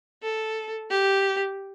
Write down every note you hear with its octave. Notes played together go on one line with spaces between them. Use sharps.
A4
G4